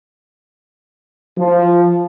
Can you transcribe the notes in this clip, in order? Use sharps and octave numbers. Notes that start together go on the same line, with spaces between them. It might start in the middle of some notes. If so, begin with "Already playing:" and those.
F3